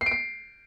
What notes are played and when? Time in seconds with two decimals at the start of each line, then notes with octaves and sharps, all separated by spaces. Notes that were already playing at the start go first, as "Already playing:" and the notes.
0.01 C7
0.06 D7
0.12 C7